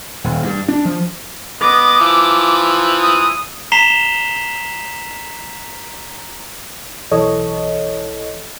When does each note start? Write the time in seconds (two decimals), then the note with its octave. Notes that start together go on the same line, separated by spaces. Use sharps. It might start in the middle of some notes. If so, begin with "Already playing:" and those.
0.24 D#1
0.43 G2
0.68 D4
0.85 F3
1.61 B3 D#5 D6
1.99 E3 F3
3.01 D#6
3.72 A#5 B6 C7 E7 F7 G7
7.11 B1 E3 A4 C#5 D#5